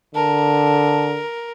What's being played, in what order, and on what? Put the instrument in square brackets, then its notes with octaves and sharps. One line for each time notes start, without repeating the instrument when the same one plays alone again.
[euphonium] D3 [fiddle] A#4 [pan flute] A5